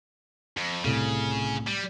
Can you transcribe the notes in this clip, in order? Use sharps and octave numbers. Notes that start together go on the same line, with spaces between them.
F2
C2 A2 C#3
G3